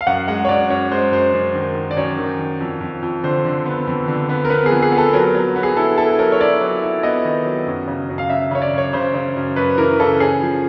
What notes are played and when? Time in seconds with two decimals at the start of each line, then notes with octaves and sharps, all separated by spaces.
0.01 F5
0.07 F#2 F#5
0.28 G#3 F#5
0.45 C#5
0.49 F#2 D5
0.70 F#2 C#5
0.92 G#3 C5
1.12 F#2 C5
1.34 F#2
1.55 D#3
1.75 D#3
1.91 D5
1.97 F#2 C#5
2.18 D#3
2.39 D#3
2.61 F2
2.81 F2
3.02 F2
3.23 D3 C5
3.45 D3
3.66 B3
3.87 F2
4.08 D3
4.29 B3
4.45 A#4
4.50 B3 B4
4.66 F2 G#4
4.82 G#4
4.92 B3
4.98 A4
5.13 F#3 A#4
5.35 F#3
5.56 B3
5.63 G#4
5.76 E4 A4
5.97 E4 A4
6.19 F#3 A#4
6.32 C#5
6.40 E4 D5
6.61 F#3
6.83 E4
7.03 B3 D#5
7.25 D#3
7.45 F#3
7.67 F#2
7.88 C#3
8.10 F#2
8.18 F5
8.30 C#3 E5
8.51 C#3 C#5
8.62 D5
8.73 F#2 C#5
8.93 C#3 C5
9.14 C#3
9.36 F#2
9.56 F#2 B4
9.78 E3 A#4
10.00 C#3 A4
10.20 C#4 G#4
10.42 F3